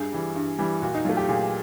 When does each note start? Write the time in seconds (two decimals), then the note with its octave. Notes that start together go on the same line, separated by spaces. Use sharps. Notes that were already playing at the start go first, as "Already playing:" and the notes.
Already playing: G2 G#4
0.12 E3 G3
0.36 G2
0.58 E3 G3
0.82 A#2 F#4
0.94 D#4
1.05 F#3 F4
1.09 A3
1.17 G4
1.29 A#2 G#4